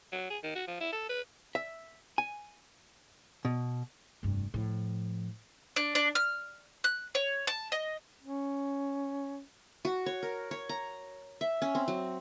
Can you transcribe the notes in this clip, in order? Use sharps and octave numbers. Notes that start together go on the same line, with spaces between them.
F#3
G#4
D#3
F#4
F3
E4
A4
B4
E5
G#5
B2
F1 G2
A2 F3
D4
D4
F6
F#6
C#5
A5
D#5
C#4
F#4
C#5
A#4
C#5
A#5
E5
C#4
C4
F#3